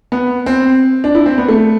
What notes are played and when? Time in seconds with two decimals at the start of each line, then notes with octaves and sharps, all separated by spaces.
0.12 B3
0.46 C4
1.04 D4
1.15 E4
1.26 C4
1.38 B3
1.48 A3